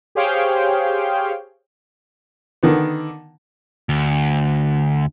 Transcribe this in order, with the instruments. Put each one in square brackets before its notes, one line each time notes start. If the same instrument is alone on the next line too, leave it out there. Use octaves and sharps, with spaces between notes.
[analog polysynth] G4 G#4 C5 C#5 F5 G5
[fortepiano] D3 D#3 B3
[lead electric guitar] D2